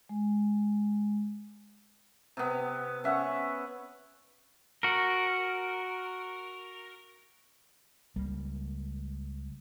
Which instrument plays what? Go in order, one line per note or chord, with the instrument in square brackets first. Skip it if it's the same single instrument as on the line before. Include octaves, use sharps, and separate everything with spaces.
[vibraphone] G#3
[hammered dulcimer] C3 B3
C#4 E5 F#5 C#6
[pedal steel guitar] F#4 A#4
[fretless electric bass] C#2 G3 A#3